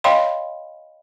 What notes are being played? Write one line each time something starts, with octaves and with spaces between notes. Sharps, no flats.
C#5 D#5 F5 G5 B5 C6